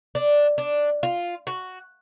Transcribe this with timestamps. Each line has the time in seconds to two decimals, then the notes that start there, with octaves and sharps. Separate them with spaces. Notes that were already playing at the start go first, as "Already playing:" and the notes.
0.15 D4
0.58 D4
1.03 F4
1.47 F#4